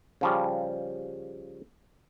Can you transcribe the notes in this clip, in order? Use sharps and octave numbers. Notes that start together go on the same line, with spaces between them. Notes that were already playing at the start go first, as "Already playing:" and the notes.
C#3 F3 G3